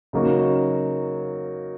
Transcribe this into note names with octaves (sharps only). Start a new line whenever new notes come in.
C#3 F#3 A#3 D#4 F#4